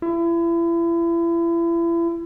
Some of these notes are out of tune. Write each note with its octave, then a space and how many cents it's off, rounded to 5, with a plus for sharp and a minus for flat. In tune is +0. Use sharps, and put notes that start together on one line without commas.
E4 +35